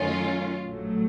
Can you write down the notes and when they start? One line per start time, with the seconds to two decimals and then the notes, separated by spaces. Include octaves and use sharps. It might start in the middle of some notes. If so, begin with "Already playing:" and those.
Already playing: F#2 D#3 F#3 A3 C#4 F4
0.63 A#1 A2 F#3 A3